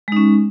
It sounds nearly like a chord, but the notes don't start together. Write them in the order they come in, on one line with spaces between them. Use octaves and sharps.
G#3 D#4 C#4